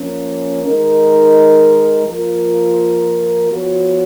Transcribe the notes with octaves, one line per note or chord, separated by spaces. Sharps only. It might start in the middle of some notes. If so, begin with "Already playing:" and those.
Already playing: F3 A#3 C#4
D#3 G#3 D#4 A#4
F3 A#3 F4 A#4
F3 B3 F#4 C#5